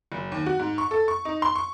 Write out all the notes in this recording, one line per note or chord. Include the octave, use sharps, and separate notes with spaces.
F#1
D#2
F#4
G#2
C#6
A4
C#6
D#4
C6
C#6